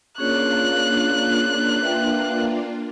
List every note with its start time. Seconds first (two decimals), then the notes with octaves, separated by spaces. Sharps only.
0.18 A#3 C#4 D4 F4 G#4 C#5 F#6
1.81 B4 E5 G5